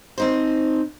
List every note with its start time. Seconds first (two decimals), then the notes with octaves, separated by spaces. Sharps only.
0.18 C4 D#4 C5